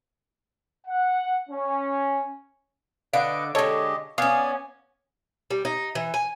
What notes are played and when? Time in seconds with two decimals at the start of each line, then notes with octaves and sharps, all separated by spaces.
0.87 F#5
1.49 C#4
3.13 D3 B4 D#5 F5 F#5 D7
3.55 D3 G#3 G4 A4 C#5 D#5
4.18 B3 C#4 D5 F5 G#5 D#6
5.51 G3
5.65 D#4
5.95 E3
6.14 G#5